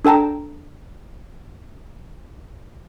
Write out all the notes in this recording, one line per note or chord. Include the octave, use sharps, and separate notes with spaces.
D4 A4 G5 A5 A#5